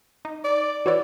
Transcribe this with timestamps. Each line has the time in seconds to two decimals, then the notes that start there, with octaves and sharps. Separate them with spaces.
0.25 D#4
0.44 D5
0.86 E3 F#4 C#5 D5